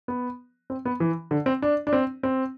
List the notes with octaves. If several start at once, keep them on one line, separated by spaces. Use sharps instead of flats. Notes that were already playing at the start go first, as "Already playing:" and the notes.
B3
C4
B3
E3
D3
C4
D4
D4
C4
C4